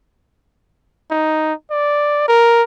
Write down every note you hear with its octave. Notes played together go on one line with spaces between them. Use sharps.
D#4
D5
A#4